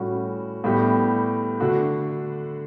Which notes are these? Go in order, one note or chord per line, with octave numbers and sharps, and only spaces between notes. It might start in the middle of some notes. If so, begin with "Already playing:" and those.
Already playing: A2 G3 C#4 F#4
A2 G3 B3 D4 G4
D3 A3 D4 F#4